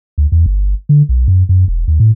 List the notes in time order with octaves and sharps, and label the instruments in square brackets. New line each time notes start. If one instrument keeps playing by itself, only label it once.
[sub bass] D2
E2
G1
D3
B1
F#2
F#2
E1
D#2
A2